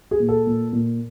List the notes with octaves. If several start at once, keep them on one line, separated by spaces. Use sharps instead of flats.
G#4
A#2
A4
A#2
A#2